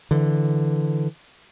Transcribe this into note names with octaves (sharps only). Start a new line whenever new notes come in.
D3 E3